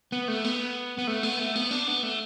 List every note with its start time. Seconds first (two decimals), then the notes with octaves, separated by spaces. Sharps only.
0.12 B3
0.28 A3
0.44 B3
0.98 B3
1.07 A3
1.23 B3
1.39 A3
1.56 B3
1.71 D4
1.88 B3
2.03 A3